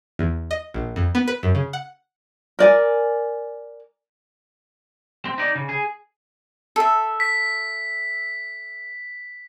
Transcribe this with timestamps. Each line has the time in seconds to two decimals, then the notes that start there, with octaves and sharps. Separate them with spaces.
0.19 E2
0.51 D#5
0.74 A#1
0.96 F2
1.15 B3
1.28 B4
1.43 F#2
1.55 C#3
1.73 F#5
2.59 A#4 D5 G#5
5.25 C4
5.38 D#4 D5
5.55 C#3
5.69 G#4
6.76 A4 E5
7.20 B6